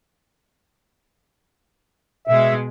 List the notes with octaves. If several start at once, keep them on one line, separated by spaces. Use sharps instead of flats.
B2 G#3 E5